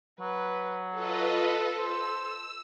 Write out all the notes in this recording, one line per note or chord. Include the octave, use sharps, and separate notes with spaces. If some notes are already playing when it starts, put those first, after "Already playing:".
F#3 B4
F4 A4 B4 D#5
C5 E6